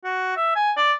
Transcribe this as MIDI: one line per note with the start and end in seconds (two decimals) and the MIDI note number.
0.04 0.36 66
0.36 0.52 76
0.56 0.72 80
0.77 0.93 74